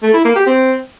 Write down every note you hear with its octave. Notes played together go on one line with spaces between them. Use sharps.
A3
E4
A#3
G4
C4